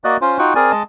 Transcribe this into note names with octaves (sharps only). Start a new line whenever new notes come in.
A#3 F#4 D5 D#5 F#6
C#4 F4 C5
D#4 F4 F#4 G5 C#6 F#6
C4 G#4 A#4 D5 G#5
G#3 D#5 A5